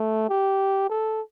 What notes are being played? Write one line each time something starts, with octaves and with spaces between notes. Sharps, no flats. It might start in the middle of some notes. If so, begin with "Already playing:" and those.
Already playing: A3
G4
A4